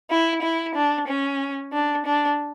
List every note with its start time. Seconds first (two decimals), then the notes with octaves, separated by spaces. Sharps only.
0.11 E4
0.43 E4
0.75 D4
1.08 C#4
1.73 D4
2.05 D4